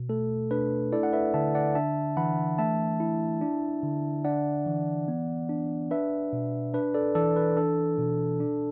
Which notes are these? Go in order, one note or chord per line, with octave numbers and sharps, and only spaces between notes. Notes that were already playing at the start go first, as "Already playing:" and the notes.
Already playing: B2
A3 A4
D4 B4
E4 A4 D5
F#5
B4 E5
D3 E5 A5
D5 F#5
D4 E5 A5
E3 F#5 B5
A3 E5 A5
E4
D4
D3
D4 D5 F#5
E3
B3
D4
D4 B4 E5
B2
D4 B4
A4 D5
E3 A4 D5
B4
D4 A4
B2
D4